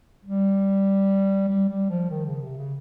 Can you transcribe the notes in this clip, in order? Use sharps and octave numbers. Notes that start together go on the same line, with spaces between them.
G3
G3
G3
F3
D#3
C#3
C3
C#3